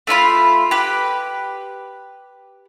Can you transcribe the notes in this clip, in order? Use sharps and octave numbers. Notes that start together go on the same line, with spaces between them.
A3 E4 F4 B5
G4 B4